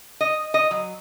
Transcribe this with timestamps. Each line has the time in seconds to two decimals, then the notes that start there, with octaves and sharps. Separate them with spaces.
0.21 D#5
0.54 D#5
0.71 F#3